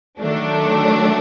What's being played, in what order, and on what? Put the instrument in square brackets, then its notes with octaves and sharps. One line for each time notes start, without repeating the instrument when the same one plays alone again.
[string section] D#3 F#3 A3 D4